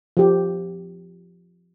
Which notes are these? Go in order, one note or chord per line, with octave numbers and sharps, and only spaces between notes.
F3 G4